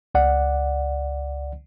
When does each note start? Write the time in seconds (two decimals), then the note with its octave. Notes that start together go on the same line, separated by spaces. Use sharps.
0.15 C#2 D5 F#5